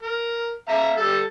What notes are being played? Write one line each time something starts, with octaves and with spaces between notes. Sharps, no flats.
A#4
E5 F5 A#5
G3 A4